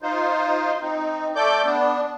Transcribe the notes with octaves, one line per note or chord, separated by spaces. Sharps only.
D#4 F4 C5
C4 D#4
A3 A4 D5 D6 G6
B3 D4